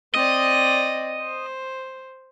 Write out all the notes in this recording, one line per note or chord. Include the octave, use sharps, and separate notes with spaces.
C4 D5 D#5
C5